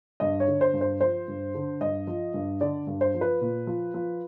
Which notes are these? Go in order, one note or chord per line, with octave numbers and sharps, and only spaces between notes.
G2 D#5
C#5
D3
C5
G2
C5
F3 C5
G2
D3
G2 D#5
F3
G2
D3 D5
G2
C5
F3
B4
A#2
F3
F3